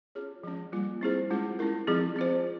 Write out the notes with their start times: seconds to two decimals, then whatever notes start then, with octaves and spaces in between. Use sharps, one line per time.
0.15 C#4 F4 G#4 C#5
0.43 F3 G#3 C#4
0.72 G3 A#3 F4
1.01 C4 E4 G#4 C5
1.30 G#3 C#4 F4
1.59 C#4 E4 A#4
1.87 F3 C4 F4 G#4
2.16 C4 F4 C5